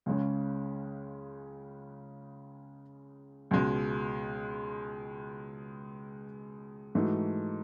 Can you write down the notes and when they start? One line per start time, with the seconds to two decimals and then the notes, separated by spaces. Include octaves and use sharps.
0.06 C#2 C#3 G#3 C#4
3.51 C#2 B2 G#3
6.95 G#2 E3 A3 D#4 F#4